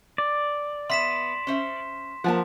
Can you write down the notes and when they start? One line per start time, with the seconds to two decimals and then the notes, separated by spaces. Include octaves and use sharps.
0.18 D5
0.90 B3 B4 E5 C6 B6 E7
1.47 C#4 C5 E5
2.24 F3 A#3 F#5 G#5 A5